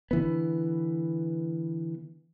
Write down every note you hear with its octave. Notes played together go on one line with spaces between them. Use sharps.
D3 E3 B3